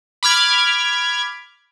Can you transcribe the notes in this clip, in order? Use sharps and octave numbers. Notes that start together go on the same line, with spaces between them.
B5 D6 F6 G#6